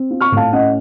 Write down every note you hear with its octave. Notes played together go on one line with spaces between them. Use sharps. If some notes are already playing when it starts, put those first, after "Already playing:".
Already playing: C4
F4
C#6 F6
A2 F5 A5
C#4 D#5 F#5